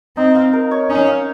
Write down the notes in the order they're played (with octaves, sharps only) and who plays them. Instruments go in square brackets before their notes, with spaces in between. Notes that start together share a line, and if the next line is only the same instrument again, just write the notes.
[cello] C4 [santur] D#4
[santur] F5
A#4
C#5
[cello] C#4 [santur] D#4
[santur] F5